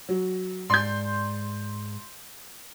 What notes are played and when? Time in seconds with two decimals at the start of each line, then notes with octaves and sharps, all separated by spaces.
0.09 F#3
0.70 G#2 D5 C6 G6